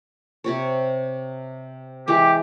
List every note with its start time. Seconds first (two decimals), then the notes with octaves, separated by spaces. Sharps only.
0.44 C3 G4 C#5
2.08 E3 G#3 G4